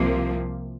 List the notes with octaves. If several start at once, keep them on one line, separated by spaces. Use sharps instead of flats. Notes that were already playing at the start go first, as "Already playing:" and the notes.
Already playing: C2 C3 F3 A#3